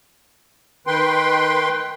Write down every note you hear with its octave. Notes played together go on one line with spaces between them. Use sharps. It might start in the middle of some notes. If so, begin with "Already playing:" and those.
D#3 B4 G5 C6